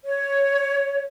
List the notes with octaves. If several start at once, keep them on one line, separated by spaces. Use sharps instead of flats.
C#5